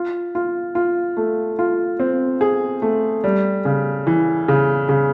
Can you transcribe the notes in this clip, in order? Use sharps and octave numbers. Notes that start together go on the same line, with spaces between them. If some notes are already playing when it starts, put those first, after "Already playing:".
Already playing: F4
F4
F4
A3
F4
C4
G#4
A3
G3
C#3
E3
C#3
C#3